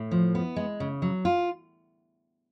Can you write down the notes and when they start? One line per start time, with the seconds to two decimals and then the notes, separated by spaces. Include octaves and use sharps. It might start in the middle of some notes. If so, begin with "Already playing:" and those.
Already playing: A2
0.11 F3
0.35 B3
0.56 G#3
0.80 C#3
1.02 F#3
1.25 F4